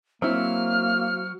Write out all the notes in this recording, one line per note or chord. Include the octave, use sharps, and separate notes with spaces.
F#3 A#3 C4 E4 F6